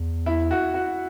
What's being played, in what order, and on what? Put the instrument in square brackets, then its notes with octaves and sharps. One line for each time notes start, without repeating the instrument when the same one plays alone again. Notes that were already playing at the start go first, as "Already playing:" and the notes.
Already playing: [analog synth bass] E2
[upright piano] E4
F#4
F#4